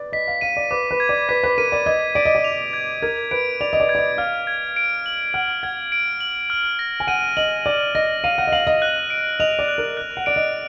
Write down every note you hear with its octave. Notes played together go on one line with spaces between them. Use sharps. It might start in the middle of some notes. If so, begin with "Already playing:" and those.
Already playing: B4 D5
D#5 B6
F5
F5 D#7
D5
B4 D6
B4
G#6
D5
B4 B6
B4
A#4 D#7
D5
D#5 G#6
D5 D7
D#5
D5
F7
G#6
A#4 G#6
B4 D7
D5 F7
D#5
D5
G#6
D5
D#5
F5 F6
G#6
D7
F#7
F#5 F6
F#5 G#6
D7
F#7
F6
A#6
G#5
F#5 D#7
D#5 F#7
D5 F6
D#5 A#6
F5 D#7
F#5
D#5
F5 F#7
D#5
F#6
D7
D#5 F7
D5
F#6
A#4
F#6
F#5
D5 D7
D#5